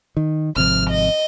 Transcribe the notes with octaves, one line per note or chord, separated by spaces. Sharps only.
D#3
G#1 C3 F3 F6
D#5